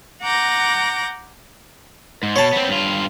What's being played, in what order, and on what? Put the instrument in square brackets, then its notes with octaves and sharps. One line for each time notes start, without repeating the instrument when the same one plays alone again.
[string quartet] F#5 A#5 D6 G6 A#6
[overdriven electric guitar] G#2
[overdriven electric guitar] B2 [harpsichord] C#5 A5
[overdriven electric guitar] B3 C4
G2 F4